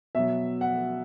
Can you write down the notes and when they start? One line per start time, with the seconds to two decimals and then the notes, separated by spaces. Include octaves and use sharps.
0.15 B2 F#3 E5
0.61 F#5